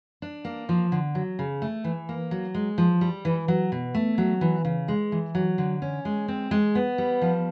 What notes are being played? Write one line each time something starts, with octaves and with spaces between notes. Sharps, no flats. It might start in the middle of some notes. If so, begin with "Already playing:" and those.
D4
A#3
F3
D3
F#3
C#3
A3
E3
A#3
F#3
G#3
F3
G3
E3
F#3
B2
A3
F#3
E3
C#3
G#3
E3
F#3
D3
C#4
G#3
C4
G#3
B3
G3
F3